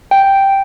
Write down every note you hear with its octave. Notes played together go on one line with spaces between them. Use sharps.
G5